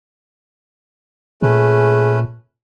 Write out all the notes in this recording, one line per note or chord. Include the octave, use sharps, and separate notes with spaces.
A#2 A3 C#4 G#4 B4